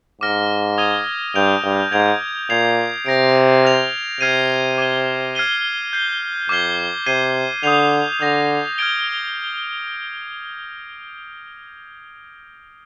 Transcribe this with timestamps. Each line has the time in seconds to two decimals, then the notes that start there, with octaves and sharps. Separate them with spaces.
0.21 G#2 D6 F6 A#6
0.78 D#6 G#6 D#7 G7
1.35 G2 G6 D7 F7
1.64 G2
1.92 G#2 G#6 D7 F7
2.50 A#2 G#6 C7 F7
3.06 C3 G6 A#6 D7
3.64 F6 A#6 F7
4.21 C3 F6 G#6 C7 D#7
4.78 D6 G#6 D#7 G7
5.35 F6 G#6 C7 D#7 G7
5.93 G6 C7 G7
6.49 F2 D6 F6 G#6 C7 G7
7.06 C3 G#6 C7 D#7 G7
7.63 D3 D#6 G6 C7 F7
8.20 D3 D#6 G6 A#6 F7
8.78 F6 G#6 D7 G7